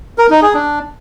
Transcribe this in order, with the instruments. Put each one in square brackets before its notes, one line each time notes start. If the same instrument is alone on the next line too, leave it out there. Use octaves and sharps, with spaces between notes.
[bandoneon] A#4
D#4
G#4
D4